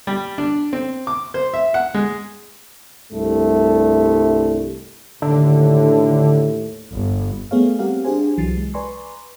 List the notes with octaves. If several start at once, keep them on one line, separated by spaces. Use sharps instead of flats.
G3
D4
C4
D6
C5
E5
F#5
G#3
C2 G2 G3 A3
D#2 A2 D3
G1
G3 A3 B3 G#4 C#5 F5
G3 C4 G4 A#4 F5 F#5
D4 G4 G#4 C5 G#5
C2 E3 F#3 A6 C7
G#3
B4 D5 G#5 A#5 C6 C#6